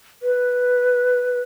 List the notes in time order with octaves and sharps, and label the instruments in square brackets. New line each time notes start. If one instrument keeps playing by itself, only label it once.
[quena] B4